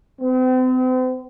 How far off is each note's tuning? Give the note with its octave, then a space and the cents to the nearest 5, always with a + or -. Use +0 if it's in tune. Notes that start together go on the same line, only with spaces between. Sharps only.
C4 -40